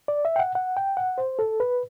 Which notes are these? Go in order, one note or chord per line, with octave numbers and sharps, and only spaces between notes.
D5
E5
G5
F#5
F#5
G5
F#5
C5
A4
B4